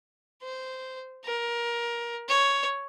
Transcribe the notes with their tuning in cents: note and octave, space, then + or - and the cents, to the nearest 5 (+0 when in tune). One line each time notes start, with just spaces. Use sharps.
C5 -10
A#4 +20
C#5 +5